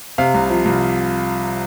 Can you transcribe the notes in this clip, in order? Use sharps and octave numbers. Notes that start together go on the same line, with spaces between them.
C3 F5
C2
F3
C2